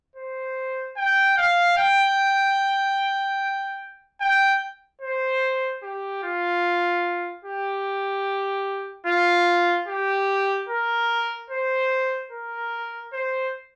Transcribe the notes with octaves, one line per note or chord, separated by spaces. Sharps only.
C5
G5
F5
G5
G5
C5
G4
F4
G4
F4
G4
A#4
C5
A#4
C5